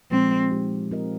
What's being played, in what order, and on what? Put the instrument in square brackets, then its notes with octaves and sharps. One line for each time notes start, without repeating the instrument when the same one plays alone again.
[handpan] A#2 F3 G#3 [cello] C4
[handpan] G#3 C4 D#4 G4
C4 F4 A#4 D#5